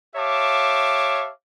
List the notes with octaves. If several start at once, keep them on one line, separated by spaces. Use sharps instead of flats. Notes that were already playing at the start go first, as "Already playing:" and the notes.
G4 C#5 E5 F5 A5 D6